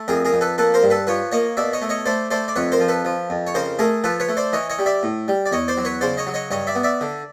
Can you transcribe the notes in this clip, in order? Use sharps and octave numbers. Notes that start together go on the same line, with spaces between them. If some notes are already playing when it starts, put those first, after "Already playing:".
Already playing: A3
F2 G#4 A#4
G#4 A#4
F2
A4 B4
A#3 A4 B4
A#4 C5
G2
A4 B4
F3 B4 C#5
A#3 C#5 D#5
B2 D5 E5
C#5 D#5
A3
C#5 D#5
A3 C5 D5
A3 C5 D5
D5
F2 B4 C#5
A#4 C5
F3
A4 B4
F3
F2
C#5
C#3 A#4 C5
A3 G#4 A#4
F3 A4 B4
B4 C#5
A3
C5 D5
E3 C#5 D#5
C#5 D#5
G3
D5 E5
A2
G3
D5
E2 C#5 D#5
C5 D5
F#3
B4 C#5
C#3 C5 D5
C#5 D#5
F#3
C#5 D#5
G2 C#5 D#5
D5 E5
B3
D5 E5
D3